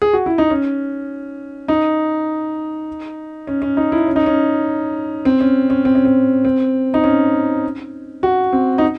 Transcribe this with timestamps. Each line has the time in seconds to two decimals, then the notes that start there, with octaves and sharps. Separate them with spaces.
0.02 G#4
0.13 F#4
0.26 E4
0.38 D#4
0.50 C#4
1.68 D#4
3.47 C#4
3.62 C#4
3.77 D#4
3.92 E4
4.07 C#4
4.16 D#4
4.26 C#4
5.25 C4
5.41 C#4
5.70 C#4
5.85 C4
5.95 C#4
6.05 C4
6.45 C4
6.94 D#4
7.04 C#4
8.23 F#4
8.53 C4
8.78 D#4